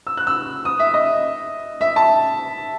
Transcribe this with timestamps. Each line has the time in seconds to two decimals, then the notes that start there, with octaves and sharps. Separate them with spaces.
0.07 E6
0.17 F#6
0.27 E6
0.65 D#6
0.79 E5
0.94 D#5
1.81 E5
1.96 A5